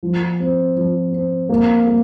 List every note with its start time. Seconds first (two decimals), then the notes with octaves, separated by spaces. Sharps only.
0.03 F3
0.40 C4
0.76 F3
1.12 C4
1.49 A#3
1.87 A#3